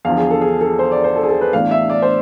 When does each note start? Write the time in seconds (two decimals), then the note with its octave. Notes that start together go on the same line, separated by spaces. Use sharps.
0.05 E2 D3 F3 F5
0.17 G#4
0.30 A4
0.41 G#4
0.61 A4
0.79 C5
0.92 D5
1.04 C5
1.16 A4
1.23 G#4
1.28 A4
1.41 B4
1.53 A2 E3 B3 D4 F5
1.71 E5
1.90 D5
2.02 C5